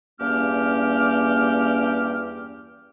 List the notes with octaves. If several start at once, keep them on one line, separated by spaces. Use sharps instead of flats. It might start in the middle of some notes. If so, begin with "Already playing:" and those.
E2 G2 A#3 C#4 G4 F6